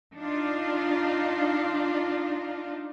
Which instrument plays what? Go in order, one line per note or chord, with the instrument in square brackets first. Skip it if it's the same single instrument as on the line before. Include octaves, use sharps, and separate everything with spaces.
[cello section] D4 D#4 F4